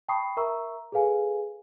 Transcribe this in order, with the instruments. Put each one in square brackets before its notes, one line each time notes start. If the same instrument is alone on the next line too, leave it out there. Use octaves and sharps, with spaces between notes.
[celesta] G5 A5 B5 C#6 D#6 C7
A#4 E5 A#5 C#6 E6
G#4 A4 B4 F5 G#5